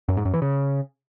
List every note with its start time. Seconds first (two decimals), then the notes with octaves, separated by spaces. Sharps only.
0.08 F#2
0.17 G#2
0.25 F#2
0.34 E3
0.42 C#3